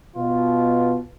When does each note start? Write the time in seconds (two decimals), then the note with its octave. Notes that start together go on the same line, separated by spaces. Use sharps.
0.16 B2 F4